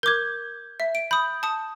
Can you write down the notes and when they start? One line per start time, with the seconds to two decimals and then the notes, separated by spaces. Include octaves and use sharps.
0.03 A#4 D6 G6 G#6
0.80 E5
0.95 D7
1.11 B5 D#6 G6
1.43 A5 D#6